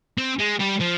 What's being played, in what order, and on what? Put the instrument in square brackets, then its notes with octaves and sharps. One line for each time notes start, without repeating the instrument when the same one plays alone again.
[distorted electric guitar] C4
G#3
G3
F3